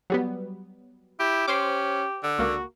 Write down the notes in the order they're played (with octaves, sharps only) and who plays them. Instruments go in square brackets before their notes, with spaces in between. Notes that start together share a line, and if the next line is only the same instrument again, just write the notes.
[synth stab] F#3 G3 B3
[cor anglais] E4 [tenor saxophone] G4
[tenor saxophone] C#4 [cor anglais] G4 [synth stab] C5 D6
[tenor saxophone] D3
[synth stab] C#2 A#3 [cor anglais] F#4